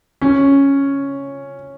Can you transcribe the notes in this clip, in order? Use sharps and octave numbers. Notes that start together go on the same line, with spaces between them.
C#4